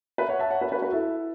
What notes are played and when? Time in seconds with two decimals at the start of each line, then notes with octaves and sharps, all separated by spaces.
0.18 B4 E5
0.29 C#5 F#5
0.39 E5 A5
0.51 C#5 F#5
0.61 B4 E5
0.71 F#4 B4
0.82 F#4 B4
0.92 E4 A4